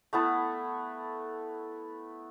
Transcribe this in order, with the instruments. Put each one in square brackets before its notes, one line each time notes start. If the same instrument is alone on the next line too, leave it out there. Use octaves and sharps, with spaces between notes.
[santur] A3 B3 E4 A4